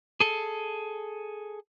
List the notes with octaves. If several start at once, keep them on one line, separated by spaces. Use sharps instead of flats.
G#4 A4